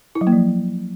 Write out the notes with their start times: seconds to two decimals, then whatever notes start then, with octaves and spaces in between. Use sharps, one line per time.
0.15 E4
0.21 F#3
0.27 A#3
0.33 F3